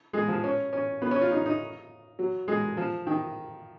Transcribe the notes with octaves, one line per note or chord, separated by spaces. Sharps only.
G#3
F3
C#4
C#4
B3
C#4
F4
D#4
D#4
F#3
G#3
F3
D#3